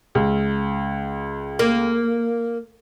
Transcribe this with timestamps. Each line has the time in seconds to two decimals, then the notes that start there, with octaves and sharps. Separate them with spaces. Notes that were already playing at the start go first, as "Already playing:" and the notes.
0.15 C#2
1.59 A#3